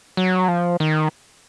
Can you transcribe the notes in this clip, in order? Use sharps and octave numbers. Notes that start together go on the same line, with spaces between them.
F#3
F3
D#3